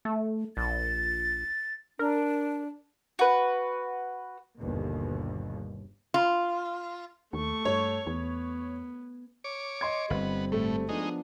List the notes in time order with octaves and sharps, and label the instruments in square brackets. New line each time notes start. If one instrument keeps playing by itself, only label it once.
[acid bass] A3
[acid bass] A#1 [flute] A6
[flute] D4 [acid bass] A#4
[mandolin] F#4 B4
[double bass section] G1 D#2 B2
[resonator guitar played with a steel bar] F4
[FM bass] D#2 [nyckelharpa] A3 C#6
[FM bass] G2 [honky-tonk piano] C#5
[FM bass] E2 [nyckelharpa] B3
[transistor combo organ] C#5 D6
[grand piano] D#5 C6 G#6
[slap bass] G1 [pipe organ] G3 C4 [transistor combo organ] B3
[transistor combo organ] A2 [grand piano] A3
[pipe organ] F3 B3 D4 [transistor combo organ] G#3 D#4